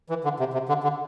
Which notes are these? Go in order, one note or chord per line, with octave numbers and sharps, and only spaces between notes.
E3
D3
C3
C3
D3
D3